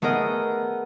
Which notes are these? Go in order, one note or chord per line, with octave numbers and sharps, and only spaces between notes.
A3 B3 G#4 A#4 D#5